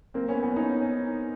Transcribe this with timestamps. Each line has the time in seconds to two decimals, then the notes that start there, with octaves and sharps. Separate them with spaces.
0.14 A#3 C4
0.28 B3 C#4
0.42 B3 C#4
0.56 C#4 D#4